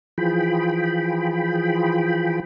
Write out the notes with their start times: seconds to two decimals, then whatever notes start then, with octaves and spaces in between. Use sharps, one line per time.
0.18 E3 F3 F4 G#4 G5 B5